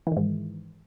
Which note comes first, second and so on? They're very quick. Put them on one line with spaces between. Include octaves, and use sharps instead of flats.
E3 D#3 G#2